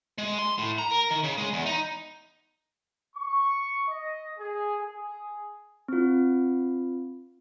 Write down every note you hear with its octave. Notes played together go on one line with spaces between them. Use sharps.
G#3
C6
A2
A#5
A#4
D#3
C#3
G#3
E2
D#4
C#6
D#5
G#4
G#4
C4 F4